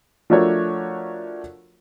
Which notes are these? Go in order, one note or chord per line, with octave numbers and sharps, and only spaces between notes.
F3 A3 D4 F#4 A#4 C#5